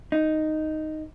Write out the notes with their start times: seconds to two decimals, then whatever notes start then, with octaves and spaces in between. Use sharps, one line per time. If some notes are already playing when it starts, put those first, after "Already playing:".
0.12 D#4